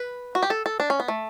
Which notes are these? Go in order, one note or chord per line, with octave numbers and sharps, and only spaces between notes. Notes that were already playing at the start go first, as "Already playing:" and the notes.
Already playing: B4
F#4
G4
A4
A4
D4
C#4
B3
A3